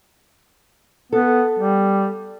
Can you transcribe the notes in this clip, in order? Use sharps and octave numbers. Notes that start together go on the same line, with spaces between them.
B3 A4
G3